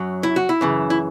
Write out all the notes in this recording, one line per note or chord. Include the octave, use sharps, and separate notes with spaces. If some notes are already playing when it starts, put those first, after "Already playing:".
Already playing: F#2 F#3
E4
F#4
E4
F#2 C#3 E3
E4